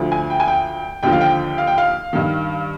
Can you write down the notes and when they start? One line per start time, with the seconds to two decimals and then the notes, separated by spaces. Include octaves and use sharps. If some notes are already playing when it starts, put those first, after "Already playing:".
Already playing: D2 D3 F3
0.12 G#5
0.30 G5
0.40 G#5
0.48 G5
1.03 D#2 D3 F3 G5
1.12 F5
1.21 G5
1.58 F5
1.67 G5
1.78 F5
2.13 G2 D#3